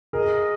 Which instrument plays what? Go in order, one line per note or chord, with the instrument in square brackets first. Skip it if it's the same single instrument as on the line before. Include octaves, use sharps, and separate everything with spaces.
[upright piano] G#4 A#4 [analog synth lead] D#5